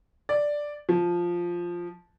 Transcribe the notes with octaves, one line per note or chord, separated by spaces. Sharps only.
D5
F3